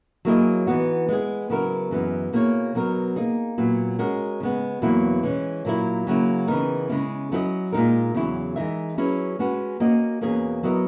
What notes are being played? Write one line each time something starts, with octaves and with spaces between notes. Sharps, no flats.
F#3 A#3 E4 G#4 D#5
E3 B3 D#4 F#4
G#3 B3 E4 G#4
C#3 F#3 B3 E4 A#4
F#2 E3 G#3 B3
B2 A#3 E4 G#4 C#5
B2 F#3 B3 D#4 A#4
A#3 D#4 G#4
A#2 F#3 B3 E4
G#3 C#4 F#4 A#4
C#3 G#3 B3
E2 B2 F#3 A#3 E4
E3 G#3 C#4
A#2 F#3 A#3 E4
C#3 F#3 A#3 E4
C#3 E3 B3 D#4 A#4
C#3 G#3 C#4 E4
F#3 C#4 E4 B4 D#5
A#2 G#3 D#4 A#4
E2 C#3 F#3 C#4 E4
E3 G#3 D#4 A#4 E5
F#3 C#4 E4 G#4 B4
G#3 C#4 F#4 B4
A#3 C#4 F#4 A#4 D#5
E2 B2 A#3 C#4 G#4
F#3 B3 E4 A#4 D#5